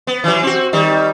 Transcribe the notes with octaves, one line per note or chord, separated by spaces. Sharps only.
B3
E3 F#3
C4 F#4
D#3 G3